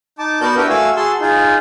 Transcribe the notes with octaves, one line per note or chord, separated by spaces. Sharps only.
D#4 A5 D6
B3 F#4 A#4 D5 A5 G6
D4 E4 F#4 G4 A#4 B4
A3 F#4 F5 G#5 E6
F#4 G#4 A5 C6 E6
D#4 F4 G#4